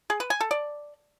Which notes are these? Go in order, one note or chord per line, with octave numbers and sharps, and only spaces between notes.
G#4
B4
G#5
A4
D5